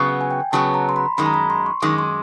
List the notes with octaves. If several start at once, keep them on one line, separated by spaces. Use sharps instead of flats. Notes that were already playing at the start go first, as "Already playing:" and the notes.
Already playing: C#3 F#3 B3
F#5
G#5
G5
C#3 F#3 B3 A5
A#5
C6
B5
F#2 D#3 G#3 B5
A#5
B5
C6
C#6
F#2 D#3 G#3 D6
C6